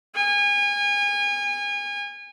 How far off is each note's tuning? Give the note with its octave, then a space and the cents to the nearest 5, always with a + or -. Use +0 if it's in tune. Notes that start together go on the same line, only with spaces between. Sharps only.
G#5 -30